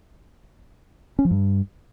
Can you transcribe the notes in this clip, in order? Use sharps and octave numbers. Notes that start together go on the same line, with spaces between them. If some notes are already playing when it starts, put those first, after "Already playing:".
C#4
F3
G2